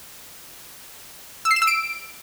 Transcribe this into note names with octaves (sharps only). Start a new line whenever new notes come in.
E6
C7
E7
E6
D7